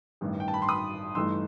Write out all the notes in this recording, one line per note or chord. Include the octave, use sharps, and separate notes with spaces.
A1 G2 D#3
G5
A5
B5
C6
B5 D#6
G2 E3 A3 D#4 C6 E6